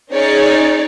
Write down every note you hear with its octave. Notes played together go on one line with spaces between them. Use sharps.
C#4 D#4 G#4 C#5 D5